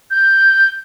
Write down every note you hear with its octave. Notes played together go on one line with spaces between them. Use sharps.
G6